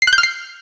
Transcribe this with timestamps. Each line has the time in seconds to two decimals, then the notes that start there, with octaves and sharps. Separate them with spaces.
0.02 C7
0.07 F#6
0.13 G6
0.18 F6
0.23 C7